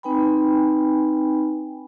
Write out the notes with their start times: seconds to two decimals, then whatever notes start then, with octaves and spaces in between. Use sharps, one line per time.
0.03 C4 D#4 B4 G5 G#5 B5